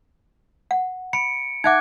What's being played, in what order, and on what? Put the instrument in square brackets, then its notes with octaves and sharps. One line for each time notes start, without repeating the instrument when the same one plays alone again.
[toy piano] F#5
[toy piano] B5 [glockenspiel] C#7 D7
[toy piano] D#4 E5 F#5 [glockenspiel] D6 F#6 G#6